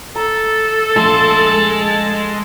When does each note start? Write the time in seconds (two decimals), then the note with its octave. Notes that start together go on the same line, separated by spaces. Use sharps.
0.16 A4 A#5
0.96 A#1 G#3 A3 A5 C6